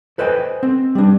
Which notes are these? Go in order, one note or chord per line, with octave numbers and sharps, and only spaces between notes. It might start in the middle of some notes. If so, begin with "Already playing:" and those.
A4 B4 C5 D#5 G5 G#5
C4
G3 D4